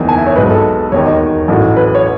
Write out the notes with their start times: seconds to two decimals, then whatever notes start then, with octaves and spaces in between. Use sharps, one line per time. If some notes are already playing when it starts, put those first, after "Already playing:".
Already playing: F#1 E2 D#3
0.09 G#5
0.18 E5
0.27 C#5
0.36 B1 B2 G#3 B4
0.50 A4
0.92 E1 D#2 D#3 C#5
1.07 D#5
1.48 A1 A2 F#3
1.76 B4
1.95 C#5